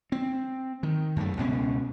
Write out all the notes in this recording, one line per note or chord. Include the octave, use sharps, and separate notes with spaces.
C4
D#3
F#2 A3
C#2 B2 C#4